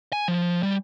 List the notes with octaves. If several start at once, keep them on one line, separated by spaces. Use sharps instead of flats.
G#5
F3
G3